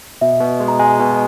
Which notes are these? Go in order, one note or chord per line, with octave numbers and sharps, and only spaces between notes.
B2 E5
B2
G#3
A#5
G#3 G#5
B2